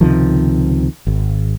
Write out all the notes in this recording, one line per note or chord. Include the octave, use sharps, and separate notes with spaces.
C#2 C3 D#3 F3
G#1